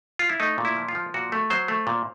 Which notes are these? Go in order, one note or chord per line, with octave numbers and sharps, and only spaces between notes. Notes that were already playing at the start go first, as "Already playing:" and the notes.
F4
E4
A3 D#4
A#2
E4
F3
F4
F3
A#2 F#4
A3
F#3 C5
A3
A#2